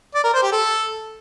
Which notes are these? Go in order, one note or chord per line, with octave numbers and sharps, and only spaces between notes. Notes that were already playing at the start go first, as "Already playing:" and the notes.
D5
A#4
C5
G4
A4